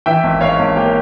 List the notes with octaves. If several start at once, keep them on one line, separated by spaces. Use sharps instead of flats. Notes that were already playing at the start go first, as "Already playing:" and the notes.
E3 E5 G5
G#1
G#2 C#5 F5
G#1
A#3 G4